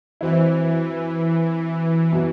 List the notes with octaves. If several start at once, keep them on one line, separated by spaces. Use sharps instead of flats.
E3 F#3 C4 E4
B2 F#3